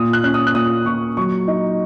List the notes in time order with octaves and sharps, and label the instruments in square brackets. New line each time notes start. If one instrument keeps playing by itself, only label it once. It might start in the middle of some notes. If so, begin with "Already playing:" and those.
Already playing: [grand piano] A#2 D#6
F#6
C#4 F#6
D#6
F#6
A#2 D#6
A#2 C#6
F#3 C#6
D#4